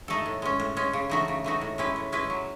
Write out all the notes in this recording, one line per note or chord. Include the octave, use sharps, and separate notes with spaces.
A3 D#4 A4
A2
G#3 C#4
A2
G#3 C#4
C#3
E3 A3 D#4 F#4
C#3
E3 A3 D#4 F#4
A2
G#3 C#4 E4 B4
A2
G#3 C#4 E4 B4
F#3